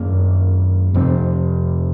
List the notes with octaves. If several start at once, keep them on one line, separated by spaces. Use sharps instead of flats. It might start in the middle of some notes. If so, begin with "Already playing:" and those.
Already playing: F#2 D#3 A#3
F2 C3 F3 C4